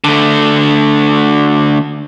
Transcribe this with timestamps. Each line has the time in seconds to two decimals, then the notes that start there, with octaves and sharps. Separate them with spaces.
0.04 D3 A3